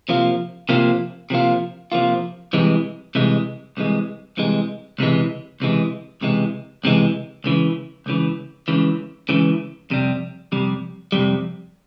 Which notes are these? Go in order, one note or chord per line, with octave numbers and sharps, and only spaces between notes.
C3 F3 A#3 F4
C3 F3 A#3 F4
C3 F3 A#3 F4
C3 F3 A#3 F4
C2 C3 E3 G#3
C2 C3 E3 G#3
C2 C3 E3 G#3
C2 C3 E3 G#3
C#2 C3 E3 G#3
C#2 C3 E3 G#3
C#2 C3 E3 G#3
C#2 C3 E3 G#3
C#2 C#3 E3
C#2 C#3 E3
C#2 C#3 E3
C#2 C#3 E3
F2 C3 G3
F2 C3 G3
F2 C3 G3